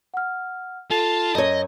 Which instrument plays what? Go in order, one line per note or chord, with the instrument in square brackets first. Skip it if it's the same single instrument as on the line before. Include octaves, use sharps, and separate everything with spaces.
[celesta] F#5 F6
[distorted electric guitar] F4 [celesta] A4 [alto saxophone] A5
[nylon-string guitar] F#2 C#5 [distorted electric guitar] D#5